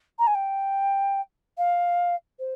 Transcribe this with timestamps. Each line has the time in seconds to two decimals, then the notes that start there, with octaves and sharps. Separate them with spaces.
0.19 A#5
0.27 G#5
0.35 G5
1.58 F5
2.39 C5